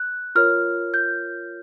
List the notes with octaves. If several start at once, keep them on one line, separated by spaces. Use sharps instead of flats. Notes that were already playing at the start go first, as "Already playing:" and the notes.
Already playing: F#6
F4 A#4 C#5 F6
G6